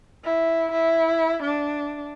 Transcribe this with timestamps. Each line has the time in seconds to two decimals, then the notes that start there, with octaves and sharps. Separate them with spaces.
0.25 E4
0.72 E4
1.43 D4